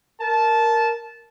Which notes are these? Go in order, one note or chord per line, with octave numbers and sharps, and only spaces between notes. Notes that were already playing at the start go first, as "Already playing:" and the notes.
A#4 A5